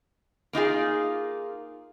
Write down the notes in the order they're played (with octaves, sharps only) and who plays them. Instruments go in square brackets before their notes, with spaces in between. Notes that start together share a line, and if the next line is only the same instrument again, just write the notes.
[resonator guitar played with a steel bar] A#3 D#4 F4 G#4